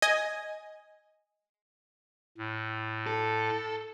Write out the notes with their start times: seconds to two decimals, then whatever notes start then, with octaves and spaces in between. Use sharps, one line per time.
0.02 D#5 G#5
2.37 A2
3.07 A4